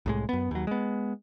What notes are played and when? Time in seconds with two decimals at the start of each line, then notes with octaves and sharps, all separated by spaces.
0.06 C2 A2 G#3
0.29 F#2 B3
0.51 D#2 F#3
0.67 G#3 B3